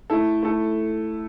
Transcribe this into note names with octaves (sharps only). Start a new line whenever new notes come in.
A3 E4 A4
A3 E4 A4